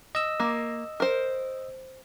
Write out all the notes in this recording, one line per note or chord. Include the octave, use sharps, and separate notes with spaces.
D#5 E6
A#3
A#4 C5